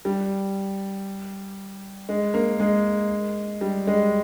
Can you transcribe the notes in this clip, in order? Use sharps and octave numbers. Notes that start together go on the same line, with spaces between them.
G3
G#3
A#3
G#3
G3
G#3